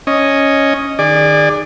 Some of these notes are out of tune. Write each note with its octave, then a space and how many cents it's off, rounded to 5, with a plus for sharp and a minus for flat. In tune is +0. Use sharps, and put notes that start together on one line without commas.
C#4 +0 D#5 +0
D#3 -25 G#4 -25 D5 +10